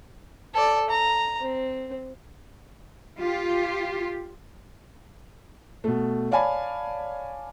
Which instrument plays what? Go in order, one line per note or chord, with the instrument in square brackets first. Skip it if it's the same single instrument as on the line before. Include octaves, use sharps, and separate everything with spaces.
[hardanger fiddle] A4 D5
A#5
C4
[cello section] F4 G4
[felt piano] B2 A3
C#5 D5 F5 G#5 A5 B5